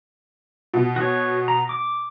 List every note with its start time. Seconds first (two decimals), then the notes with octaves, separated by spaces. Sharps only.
0.74 B2
0.96 F#4 C#5
1.48 A#5
1.69 D6